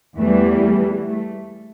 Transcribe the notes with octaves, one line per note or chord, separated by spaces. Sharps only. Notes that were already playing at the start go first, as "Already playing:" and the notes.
E2 E3 G3 A3
A3
A3